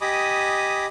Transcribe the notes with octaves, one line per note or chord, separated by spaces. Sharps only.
G4 D#5 G#5 B5 D6 D#6